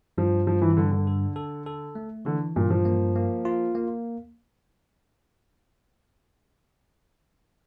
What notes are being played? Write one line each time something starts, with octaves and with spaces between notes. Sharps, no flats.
G2 F3
G2 F3
E3
E3
G2 D3
D3
A4
A4
A4
A3
D3 E3
G2 A#2
F3
A#3
A#3
F4
A#3